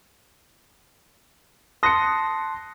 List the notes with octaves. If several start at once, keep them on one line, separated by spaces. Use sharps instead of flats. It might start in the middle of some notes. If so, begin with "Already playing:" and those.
A5 C6 D#6 F#6 A#6 C#7